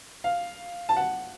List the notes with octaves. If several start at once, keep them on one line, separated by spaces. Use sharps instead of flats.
F5
A5
F#5